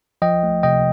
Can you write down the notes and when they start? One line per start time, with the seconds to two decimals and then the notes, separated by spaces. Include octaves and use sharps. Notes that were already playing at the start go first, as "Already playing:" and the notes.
0.22 F3 D#5 G5
0.43 A3
0.63 C3 D#5 G5